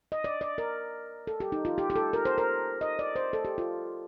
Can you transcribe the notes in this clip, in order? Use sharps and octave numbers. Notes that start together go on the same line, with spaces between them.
D#5
D5
D5
A#4
A4
G4
D#4
F4
G4
G4
A4
A#4
C5
A#4
D#5
D5
C5
A4
G4
F4